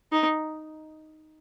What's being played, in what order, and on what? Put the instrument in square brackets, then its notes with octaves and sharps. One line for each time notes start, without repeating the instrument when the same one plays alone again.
[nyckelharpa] D#4